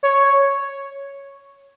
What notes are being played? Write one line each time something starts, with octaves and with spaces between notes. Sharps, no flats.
C#5